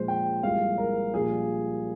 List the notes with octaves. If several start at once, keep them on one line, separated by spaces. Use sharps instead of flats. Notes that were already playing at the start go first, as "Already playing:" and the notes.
Already playing: A#1 A#2 G#3 C5
G5
C2 A#2 F3 G#3 F5
A#4
A#1 A#2 G3 G#4